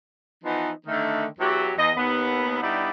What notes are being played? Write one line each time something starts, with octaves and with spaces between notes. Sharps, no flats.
E3 F3 B3 D#4
D3 D#3 A3
E2 E3 F#3 F#4 G4
E2 D#5
D#2 B3
G2 B3 D#4 E4 G4 D5